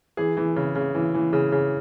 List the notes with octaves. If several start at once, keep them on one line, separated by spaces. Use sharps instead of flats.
E3 G#4
E3
C#3
C#3
E3
E3
C#3
C#3